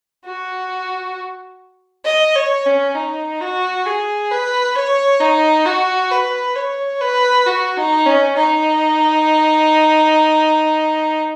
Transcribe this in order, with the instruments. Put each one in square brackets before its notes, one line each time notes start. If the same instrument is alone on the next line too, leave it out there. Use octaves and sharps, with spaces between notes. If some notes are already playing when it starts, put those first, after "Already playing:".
[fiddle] F#4
D#5
C#5
C#4
D#4
F#4
G#4
B4
C#5
D#4
F#4
B4
C#5
B4
F#4
D#4
C#4
D#4